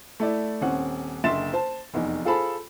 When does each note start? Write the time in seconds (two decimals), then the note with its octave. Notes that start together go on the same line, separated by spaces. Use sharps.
0.20 A3 E4 D5
0.61 D#1 C4 C#4 F#5
1.24 F#1 D3 E5 C6 A6 E7
1.53 C5 A5
1.94 F1 E2 D#4
2.25 F4 G#4 A4 C5 A5 B5